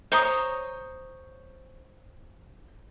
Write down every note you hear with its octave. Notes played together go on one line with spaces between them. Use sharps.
C5 C#5 A#5 D#6